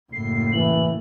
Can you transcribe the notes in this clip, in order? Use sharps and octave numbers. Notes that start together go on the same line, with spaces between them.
F#1 A2 C7
E3 F#7